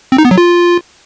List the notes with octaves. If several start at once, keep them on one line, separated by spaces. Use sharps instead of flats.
C4
D#4
B3
F#3
F4